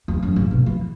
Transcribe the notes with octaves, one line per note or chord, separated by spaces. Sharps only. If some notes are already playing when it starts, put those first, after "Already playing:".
E2
F#2
G#2
B2
E3